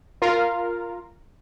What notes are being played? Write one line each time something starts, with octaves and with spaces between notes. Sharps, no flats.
F4 A#4 F5